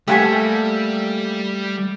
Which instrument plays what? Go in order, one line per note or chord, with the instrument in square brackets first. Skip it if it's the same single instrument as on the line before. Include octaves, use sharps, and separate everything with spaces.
[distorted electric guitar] G3 [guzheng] A3 [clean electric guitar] A#3 A4 E5 [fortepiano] G4 F#5 G#5